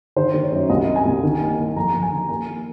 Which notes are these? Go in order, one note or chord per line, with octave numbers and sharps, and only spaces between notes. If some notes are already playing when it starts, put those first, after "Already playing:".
D#3 C5
D#3
C#5
F#2
C2 D#5
C4
G#5
C2
D#3
A#3
A#3
F2 A#5
F2
G#5
D#3
A#3 G#5
A#3